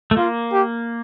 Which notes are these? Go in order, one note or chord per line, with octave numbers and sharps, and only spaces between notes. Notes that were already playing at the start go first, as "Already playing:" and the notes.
A3
A#3 F4
G4